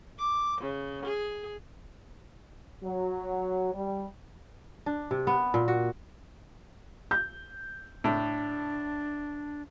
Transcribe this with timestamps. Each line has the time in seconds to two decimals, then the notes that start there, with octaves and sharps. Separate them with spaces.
0.18 D6
0.61 C#3
1.05 G#4
2.84 F#3
3.74 G3
4.86 D4
5.11 C3
5.27 B3
5.54 A#2
5.68 F#4
7.11 G6
8.04 A2 D4